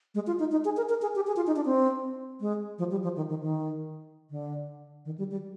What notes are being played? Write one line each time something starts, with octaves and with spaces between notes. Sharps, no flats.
G#3
F4
D#4
D#4
G#4
A#4
A#4
G#4
G4
G#4
F4
D#4
D4
C4
G#3
F3
G3
F3
D#3
D#3
D#3
D3
D#3
G3
G3